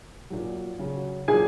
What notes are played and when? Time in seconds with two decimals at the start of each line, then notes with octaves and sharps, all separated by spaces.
0.30 A#2 F#3
0.79 C#3 F#3
1.28 A#2 F#3 G#4 G#5